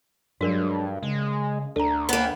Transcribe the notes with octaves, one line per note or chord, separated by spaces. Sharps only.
G2 F#3 G#3 D4 F#4 A#4 D5
C#3 G#3
D2 D4 A4 A#5
A#3 B3